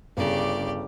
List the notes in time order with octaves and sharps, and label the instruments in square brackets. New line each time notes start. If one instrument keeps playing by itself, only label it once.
[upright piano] G1 [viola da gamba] C#3 [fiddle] G4 D5